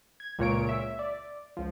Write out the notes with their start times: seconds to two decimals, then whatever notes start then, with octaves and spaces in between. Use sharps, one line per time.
0.20 G#6
0.39 C#2 A#2 C#5 D7
0.69 E5
0.99 D5
1.57 C#2 F3